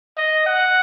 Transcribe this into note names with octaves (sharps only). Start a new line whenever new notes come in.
D#5
F#5